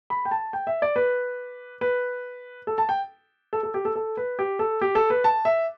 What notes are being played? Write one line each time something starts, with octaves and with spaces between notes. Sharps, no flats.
B5
G5
A5
G5
E5
D5
B4
B4
A4
A5
G5
A4
A4
G4
A4
A4
B4
G4
A4
G4
A4
B4
A5
E5